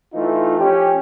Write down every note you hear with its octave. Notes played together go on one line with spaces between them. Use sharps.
E3 A3 D#4 F4
F3 C#4 G4